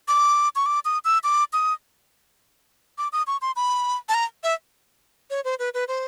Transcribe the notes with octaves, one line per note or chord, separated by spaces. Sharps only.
D6
C#6
D6
D#6
E6
D6
D#6
D6
D#6
C#6
C6
B5
A5
A#5
E5
C#5
C5
B4
B4
C5